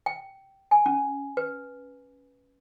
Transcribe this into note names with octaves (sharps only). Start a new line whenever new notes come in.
G5
G#5
C#4
B4